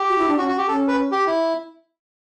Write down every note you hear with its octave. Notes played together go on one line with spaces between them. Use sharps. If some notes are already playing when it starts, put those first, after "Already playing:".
Already playing: G4
F#4
E4
D4
C#4 F#4
F#4
G4
C#4 A4
B4
G4
E4